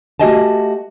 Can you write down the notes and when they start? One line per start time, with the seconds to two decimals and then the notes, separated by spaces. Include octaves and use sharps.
0.20 A3 F#4 G4 D#5 G#5 A5